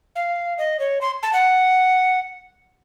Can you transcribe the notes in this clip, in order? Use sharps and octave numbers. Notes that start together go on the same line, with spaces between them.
F5
D#5
C#5
C6
A5
F#5